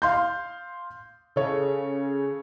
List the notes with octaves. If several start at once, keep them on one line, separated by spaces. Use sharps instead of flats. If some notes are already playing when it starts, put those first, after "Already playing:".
F5 C6 G6
C#3 A4 C#5